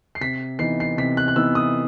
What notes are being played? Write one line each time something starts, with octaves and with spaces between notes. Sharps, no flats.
C7
C3 B6
E3 B3 D#4 C7
C7
C3 B6
F#6
F#6
E3 B3 D#4 E6
D#6